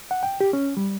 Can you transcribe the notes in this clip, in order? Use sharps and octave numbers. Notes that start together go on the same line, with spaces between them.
F#5
G5
G4
C#4
G3